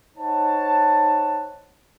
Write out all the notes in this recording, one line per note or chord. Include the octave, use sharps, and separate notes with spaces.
D#4 C5 C#5 F#5 A5